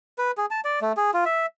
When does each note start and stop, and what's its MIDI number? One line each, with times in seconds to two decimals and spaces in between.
0.18 0.31 71
0.38 0.46 68
0.51 0.60 81
0.65 0.79 74
0.81 0.92 57
0.97 1.11 68
1.14 1.24 65
1.25 1.46 76